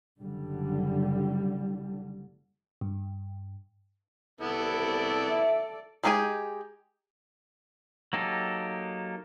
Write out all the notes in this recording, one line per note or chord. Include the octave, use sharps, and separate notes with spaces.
F#1 D3 G3
G2
C2 B3 E4 A4 D5
E5
G#3 D#4 G4 G#4 G#5
F#3 A#3 D#4 G4 A4